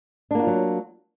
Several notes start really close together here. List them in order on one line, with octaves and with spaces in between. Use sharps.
D4 A#3 F#4 F4 F#3